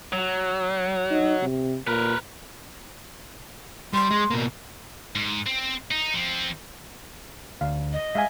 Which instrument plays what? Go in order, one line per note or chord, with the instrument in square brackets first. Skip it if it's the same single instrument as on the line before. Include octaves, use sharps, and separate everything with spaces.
[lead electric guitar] F#3
[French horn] D#4
C3
[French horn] A#2 [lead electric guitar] A#4 B4
[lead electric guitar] G3 [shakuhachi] C6
[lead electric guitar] G#3
B2 A#3
[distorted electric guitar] G#2
C4
D#4
F3 C4
[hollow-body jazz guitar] D2 [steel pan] F5
[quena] D#5
[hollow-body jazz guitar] G#3 [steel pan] E5 F5 G#5